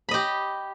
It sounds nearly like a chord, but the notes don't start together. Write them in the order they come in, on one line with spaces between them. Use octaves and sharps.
B5 D#5 G4